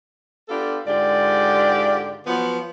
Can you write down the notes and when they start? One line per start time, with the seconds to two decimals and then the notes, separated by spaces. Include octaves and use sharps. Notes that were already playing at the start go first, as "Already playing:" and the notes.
0.49 B3 D4 F4 G4 A4
0.87 G#2 D3 F4 G4 D5
2.26 F3 F#3 B3